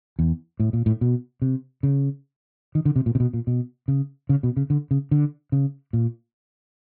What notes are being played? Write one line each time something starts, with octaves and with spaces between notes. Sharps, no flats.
E2
A2
A#2
A2
B2
C3
C#3
D#3
D3
C3
A#2
C3
B2
A#2
B2
C#3
C#3
B2
C#3
D3
C#3
D3
C#3
A#2